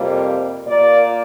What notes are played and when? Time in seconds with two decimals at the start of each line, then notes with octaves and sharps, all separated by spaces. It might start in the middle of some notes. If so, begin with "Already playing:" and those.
Already playing: F2 C3 G3 A#3
0.67 A#2 A#3 D5